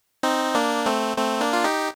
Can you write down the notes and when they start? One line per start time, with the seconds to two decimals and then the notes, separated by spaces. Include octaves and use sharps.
0.23 C4 D#4
0.55 A#3 D4
0.86 A3 C4
1.18 A3 C4
1.41 A#3 D4
1.53 F4
1.64 D#4 G4